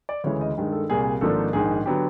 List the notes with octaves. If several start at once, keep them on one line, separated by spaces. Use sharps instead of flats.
D5
D2 C#3 E3 G#3 C#5
D#5
G2 D#3 G#3
A4
C2 A#2 G3 G#4
G#1 G#2 F3 A#3 D4 A4
A#1 G#2 D#3 G#4
D3 F#3 B3 G4